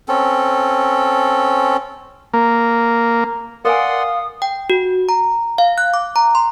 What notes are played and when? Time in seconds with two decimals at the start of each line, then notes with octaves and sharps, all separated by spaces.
0.08 C4 C#4 A4
2.34 A#3
3.65 A#4 B4 D5 F5 F#5 G#5 C6 D#6
4.42 G5
4.70 F#4
5.09 A#5
5.58 F5
5.78 F#6
5.94 D6
6.16 A#5
6.35 C6